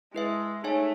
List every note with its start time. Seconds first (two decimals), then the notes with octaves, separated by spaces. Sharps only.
0.14 G#3 E4 B4 E5
0.64 A3 D#4 G#4 C#5 E5 G#5